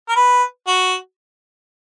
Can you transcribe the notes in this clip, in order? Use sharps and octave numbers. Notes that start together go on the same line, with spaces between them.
A#4
B4
F#4